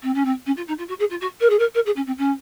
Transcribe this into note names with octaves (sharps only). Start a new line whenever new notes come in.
C4
C#4
C4
C#4
F4
D#4
F4
F#4
G#4
F4
F#4
A#4
G#4
A#4
A#4
G#4
C#4
C4
C#4